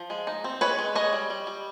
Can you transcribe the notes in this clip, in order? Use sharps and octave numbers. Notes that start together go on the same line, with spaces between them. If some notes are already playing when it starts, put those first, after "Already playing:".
Already playing: F3
G#3
D#4
C4
G#3 B4 C#5
G#3
G#3 C#5 D#5
G3
G3
G3